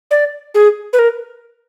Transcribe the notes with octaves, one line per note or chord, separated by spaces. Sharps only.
D5
G#4
B4
A#4